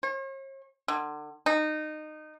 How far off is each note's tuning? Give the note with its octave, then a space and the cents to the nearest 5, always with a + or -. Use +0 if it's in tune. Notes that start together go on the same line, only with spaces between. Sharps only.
C#5 -45
D3 +35
D#4 -20